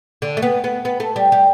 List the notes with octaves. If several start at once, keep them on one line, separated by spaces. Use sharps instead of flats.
D3
A3
B3
B3
B3
A3
G3
G3